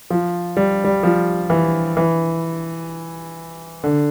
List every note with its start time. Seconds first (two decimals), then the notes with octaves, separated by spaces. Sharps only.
0.10 F3
0.57 G3
0.84 G3
1.03 F3
1.50 E3
1.97 E3
3.84 D3